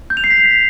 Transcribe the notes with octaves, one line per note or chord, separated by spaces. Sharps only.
G6
F7
C7
B6